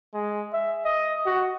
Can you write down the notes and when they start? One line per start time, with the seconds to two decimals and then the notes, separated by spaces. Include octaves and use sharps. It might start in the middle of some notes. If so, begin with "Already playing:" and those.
0.13 G#3
0.53 E5
0.85 D#5
1.26 F#4